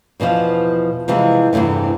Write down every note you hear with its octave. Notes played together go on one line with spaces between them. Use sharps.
E2 B2 D3 F3
C3 E3 F3 G3 G#3
E2 G2 C3 E3 A3